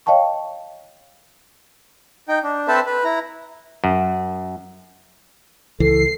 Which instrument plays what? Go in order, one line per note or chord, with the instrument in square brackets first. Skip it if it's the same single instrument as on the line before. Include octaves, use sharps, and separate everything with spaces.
[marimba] C#5 D#5 F5 G5 A5 C#6
[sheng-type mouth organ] D#4 G5
D4
C4 A4 B4 C5 E5 A5
B4
E4 A#5
[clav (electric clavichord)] F#2
[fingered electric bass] C#2 E3 [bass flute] A4 [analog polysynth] C7